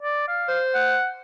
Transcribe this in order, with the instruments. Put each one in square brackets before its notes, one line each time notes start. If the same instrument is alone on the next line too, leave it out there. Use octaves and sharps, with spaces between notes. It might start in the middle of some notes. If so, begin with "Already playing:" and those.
[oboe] D5
F5
[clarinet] C5
[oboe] F#5